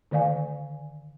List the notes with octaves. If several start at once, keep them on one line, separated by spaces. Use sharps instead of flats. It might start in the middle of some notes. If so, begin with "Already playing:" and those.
D3 D#3 D5 F5 G#5